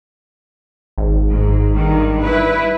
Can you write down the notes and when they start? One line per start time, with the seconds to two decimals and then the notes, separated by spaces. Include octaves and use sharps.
0.98 G#1
1.30 G#2
1.76 G2 D#3
2.22 E4 B4